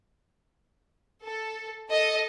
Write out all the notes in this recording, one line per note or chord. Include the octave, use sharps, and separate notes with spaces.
A4
A4 D#5